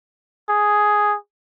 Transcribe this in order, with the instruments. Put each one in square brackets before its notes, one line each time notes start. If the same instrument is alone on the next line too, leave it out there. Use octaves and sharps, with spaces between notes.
[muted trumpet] G#4